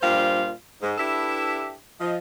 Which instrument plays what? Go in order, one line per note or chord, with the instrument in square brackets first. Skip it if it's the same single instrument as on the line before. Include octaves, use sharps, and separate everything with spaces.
[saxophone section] G2 A#2 F4 C5
G#2
D4 E4 G4 A4 B4 E5
F3 D#5